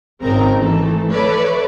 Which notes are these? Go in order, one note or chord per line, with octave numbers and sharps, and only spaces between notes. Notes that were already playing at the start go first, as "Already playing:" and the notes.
G#1 C#3 C4 D#4 A#4 A#5
E3 A3 A4
A4 B4 C#5 D5 E5